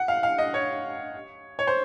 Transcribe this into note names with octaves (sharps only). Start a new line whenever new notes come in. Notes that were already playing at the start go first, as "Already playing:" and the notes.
Already playing: F#5
F5
F5
D#5
C#5
C#5
C5